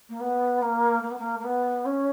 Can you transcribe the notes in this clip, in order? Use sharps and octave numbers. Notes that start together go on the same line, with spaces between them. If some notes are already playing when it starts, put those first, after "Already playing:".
A#3
B3
A#3
A#3
B3
A#3
A#3
B3
C#4